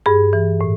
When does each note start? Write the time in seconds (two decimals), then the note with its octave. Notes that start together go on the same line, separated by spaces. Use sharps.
0.06 G2 G#4
0.33 E3
0.61 A2